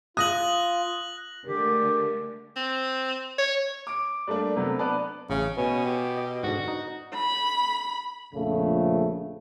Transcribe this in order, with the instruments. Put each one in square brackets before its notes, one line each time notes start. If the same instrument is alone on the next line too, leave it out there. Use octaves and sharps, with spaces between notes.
[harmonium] F4 [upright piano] D#6 [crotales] F#6 A#6 F#7
[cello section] D3 G#3 A3 [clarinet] G4 [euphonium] A#4
[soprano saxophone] C4
C#5
[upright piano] D6 D7
G3 A3 A#3 D4
C3 F#3 A3 B3
B3 D4 B4 D5 A5
[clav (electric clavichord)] A1 [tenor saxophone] C#3
[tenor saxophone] B2 [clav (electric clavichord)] B3 [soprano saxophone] C#4
[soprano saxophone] G4
[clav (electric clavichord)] D#5
[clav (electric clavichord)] G#2 D3 [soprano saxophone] F#4
[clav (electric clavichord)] D#4
[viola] B5
[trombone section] A#1 F2 C#3 A3